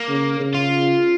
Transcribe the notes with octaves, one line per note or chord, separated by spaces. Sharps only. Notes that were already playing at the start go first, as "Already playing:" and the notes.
Already playing: A#3
C#3
C#3
F4